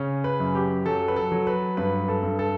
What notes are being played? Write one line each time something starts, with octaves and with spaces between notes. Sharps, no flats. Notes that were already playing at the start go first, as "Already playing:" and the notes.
Already playing: C#3 C#4
B4
F#2
G4
F#3 A4
B4
A4
F#3
B4
G2 B4
A4
G2
A4